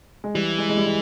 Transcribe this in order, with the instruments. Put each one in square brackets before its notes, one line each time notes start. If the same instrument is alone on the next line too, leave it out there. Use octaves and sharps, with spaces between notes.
[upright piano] G#3
[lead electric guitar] E3 [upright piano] G3
[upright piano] G#3
G#3
G3
G#3